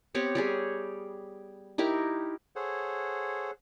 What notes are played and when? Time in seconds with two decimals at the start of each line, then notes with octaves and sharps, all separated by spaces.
0.15 B3 C4 G4 C#5
0.35 G3 G4 G#4 C#5
1.78 D#4 E4 G4 A#4
2.56 G#4 A4 C5 C#5 F#5